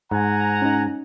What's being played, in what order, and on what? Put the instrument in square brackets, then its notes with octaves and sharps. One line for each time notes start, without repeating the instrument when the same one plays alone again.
[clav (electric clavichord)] G#2 [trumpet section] F#5 G#5 A#5
[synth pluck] C#4 D#4